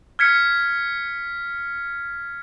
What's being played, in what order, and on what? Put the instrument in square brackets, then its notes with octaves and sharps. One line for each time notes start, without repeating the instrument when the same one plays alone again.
[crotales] F6 G#6 B6 C#7